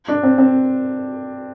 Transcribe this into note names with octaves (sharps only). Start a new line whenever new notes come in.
D4
C4
C4